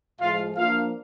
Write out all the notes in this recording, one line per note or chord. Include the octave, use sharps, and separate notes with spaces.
A2 F3 G#3 F4 F5
F3 A#3 D4 F4 F5